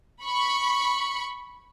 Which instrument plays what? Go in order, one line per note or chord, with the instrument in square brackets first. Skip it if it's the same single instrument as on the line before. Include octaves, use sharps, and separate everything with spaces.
[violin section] B5 C#6